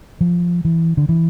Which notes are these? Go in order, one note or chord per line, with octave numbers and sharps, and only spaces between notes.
F3
E3
D3
E3